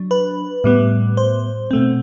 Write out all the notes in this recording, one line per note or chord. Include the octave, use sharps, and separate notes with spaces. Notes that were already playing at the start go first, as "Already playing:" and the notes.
Already playing: F#3 D4
B4
A2 G3 B3
C5
B2 A3 C4